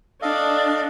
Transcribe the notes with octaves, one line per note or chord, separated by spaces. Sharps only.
D4 A4 D#5 F5